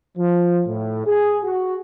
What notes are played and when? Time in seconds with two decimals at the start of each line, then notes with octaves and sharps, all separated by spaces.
0.17 F3
0.67 A2
1.06 G#4
1.44 F#4